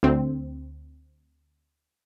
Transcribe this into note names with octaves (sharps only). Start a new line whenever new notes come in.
D2 C4